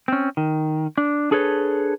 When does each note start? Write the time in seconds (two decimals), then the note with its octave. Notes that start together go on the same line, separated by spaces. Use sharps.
0.08 C4 C#4
0.37 D#3
0.98 D4
1.31 D4 G#4 A4 B4 C#5